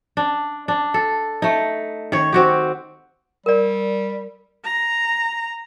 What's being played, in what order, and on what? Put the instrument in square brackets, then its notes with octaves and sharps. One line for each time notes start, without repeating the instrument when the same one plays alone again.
[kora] D4
D4
A4
A3 D#4
D#3 C#5
C4 F#4 G4
[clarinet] G3 [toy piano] A#4 D5
[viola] A#5